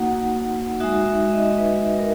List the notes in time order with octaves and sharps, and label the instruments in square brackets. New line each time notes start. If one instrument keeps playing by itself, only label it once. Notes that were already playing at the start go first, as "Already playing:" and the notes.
Already playing: [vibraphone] A#3 D#4 F#4 F#5
G#3 D#4 F#4 E5
E5
E5
D#5
B4
A#4